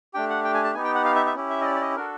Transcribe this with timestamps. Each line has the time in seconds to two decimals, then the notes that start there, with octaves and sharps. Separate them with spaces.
0.14 A3 D4 G4 G5
0.30 F#5
0.44 G5
0.54 G#5
0.64 A5
0.75 B3 D#4 G4 G#5
0.84 G5
0.95 F#5
1.05 F5
1.15 E5
1.26 E5
1.35 C#4 E4 G4
1.50 E5
1.61 D#5
1.65 D5
1.76 D5
1.81 D#5
1.96 D4 F#4 A4 A#4